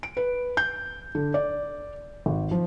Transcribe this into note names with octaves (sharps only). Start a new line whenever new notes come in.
D7
B4
G6
D3
D5
G#1
F3